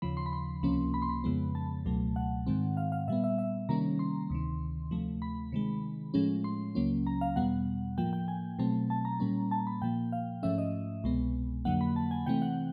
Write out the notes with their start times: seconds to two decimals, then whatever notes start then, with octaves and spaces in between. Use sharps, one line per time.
0.02 D#2 C#3 F3 B5
0.17 C6
0.26 B5
0.33 C6
0.63 C#2 C3 F3 A#3 C#4
0.94 B5
1.02 C6
1.09 B5
1.24 F2 C#3 F3 G#3 B3
1.55 A5
1.85 C#2 B2 F#3 A3
2.16 F#5
2.47 G#2 D#3 G#3 C4
2.77 F5
2.92 F5
3.08 A#2 G3 B3 E5
3.24 E5
3.38 E5
3.69 C3 D#3 G3 A#3 C#4 A#5
3.99 C6
4.30 D2 C3 D#3
4.91 D2 C3 F3 A3
5.22 B5
5.52 C3 D#3 G#3
6.14 A2 F3 G#3 C#4
6.44 C6
6.75 C#2 C#3 F#3 A#3 C#4
7.07 A#5
7.21 F5
7.36 E2 B2 G3 B3 F#5
7.98 A2 F3 A#3 G5
8.13 G5
8.28 G#5
8.59 B2 F#3 A3 C4 A5
8.90 A5
9.05 A#5
9.20 A#2 G3 A#3 C#4
9.51 A5
9.67 B5
9.82 A#2 F3 A#3 G5
10.12 F5
10.43 G#2 F3 A3 C#4 E5
10.58 D#5
11.04 C2 B2 G#3 B3
11.65 F2 D3 F#3 A#3 F#5
11.81 B5
11.96 A5
12.11 G#5
12.26 C3 E3 A3 C4 G5
12.42 F#5